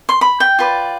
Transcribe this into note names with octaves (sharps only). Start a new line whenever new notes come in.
C6
B5
G5
F4 B4 D5